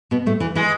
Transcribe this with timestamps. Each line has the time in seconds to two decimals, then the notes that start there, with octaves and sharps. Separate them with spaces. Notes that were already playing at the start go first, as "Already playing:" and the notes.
0.11 B2 B3
0.26 A2 A3
0.40 E2 E3
0.55 E3 G#3